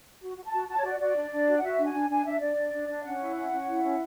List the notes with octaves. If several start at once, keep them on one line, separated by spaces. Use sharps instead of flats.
F#4
F#4
A5
F#4
F#4 A5
C#5
F#4 D5
F#4 D5
D4
D4
F#4
F#5
F#4 E5
D4
G#5
D4
D4 G#5
D4 E5
D4 D5
D4
D4
D4
C#4 F#5
E4
C#4
C#4
E4
C#4